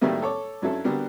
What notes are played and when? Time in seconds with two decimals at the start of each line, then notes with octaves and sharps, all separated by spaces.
0.01 A2 D#3 F#3 G3 A3 A#3
0.22 A4 C#5 D6
0.62 G2 F#3 C#4 E4 A4
0.84 D3 G3 B3 F#4 A#4